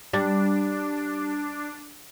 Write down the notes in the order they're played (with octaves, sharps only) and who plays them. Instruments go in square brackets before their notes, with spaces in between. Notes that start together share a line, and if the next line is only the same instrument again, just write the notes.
[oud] G3 [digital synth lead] D4